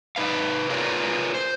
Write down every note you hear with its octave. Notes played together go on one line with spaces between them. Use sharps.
D#4 B4 F5
F4 G#4 A#4 B4 C#5 D5
C5